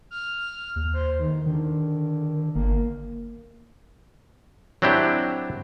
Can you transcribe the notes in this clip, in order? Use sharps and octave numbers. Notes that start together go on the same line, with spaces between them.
F6
D#2
C5
D#3
D3 D#3
G1 A#3
F#3 C4 D4 E4 G4